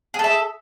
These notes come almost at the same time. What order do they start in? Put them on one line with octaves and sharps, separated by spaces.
G#4 A4 E5